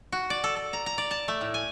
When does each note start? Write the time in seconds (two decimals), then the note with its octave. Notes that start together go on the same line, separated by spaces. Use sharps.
0.12 F#4
0.30 D5
0.44 A4
0.56 A4
0.73 A#5
0.86 A#5
0.98 D5
1.11 A5
1.28 A3
1.41 A2
1.54 G#5